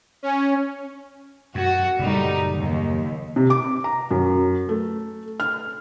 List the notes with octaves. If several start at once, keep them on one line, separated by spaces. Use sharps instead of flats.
C#4
F#2 F#4
F#1 A#2 G3 A3 D#4
D#2
C3
D6
A#5
F#2
A3
F6